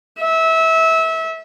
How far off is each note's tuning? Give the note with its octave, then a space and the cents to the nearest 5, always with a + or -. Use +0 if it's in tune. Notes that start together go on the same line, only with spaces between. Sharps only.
E5 -25